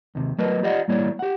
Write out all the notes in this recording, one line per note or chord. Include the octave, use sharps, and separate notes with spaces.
D#2 C3
F#3 A3 A#4 B4 D#5
F4 G4 D5 D#5 F5 F#5
A2 G3 A#3 E4 C#5 D5
G4 F#5